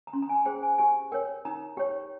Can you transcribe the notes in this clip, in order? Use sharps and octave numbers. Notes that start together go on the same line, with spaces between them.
A#5
C#4 C6
A#5
G#5
G#4 C5 G5
G#5
G4 G#5
A#4 C#5 G5
D#4 A#5
G4 C#5 G5